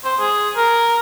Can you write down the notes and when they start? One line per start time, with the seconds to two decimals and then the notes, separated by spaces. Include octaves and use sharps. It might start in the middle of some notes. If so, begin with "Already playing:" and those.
0.05 C5
0.20 G#4
0.56 A#4